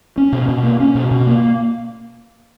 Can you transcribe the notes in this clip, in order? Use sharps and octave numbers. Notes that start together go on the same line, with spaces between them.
C#4
B2
B2
A#3
C#4
B2
B2
A#3